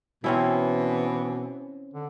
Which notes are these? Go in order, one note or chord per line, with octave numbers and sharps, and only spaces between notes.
B2 E3 C4 C#4 E4
D3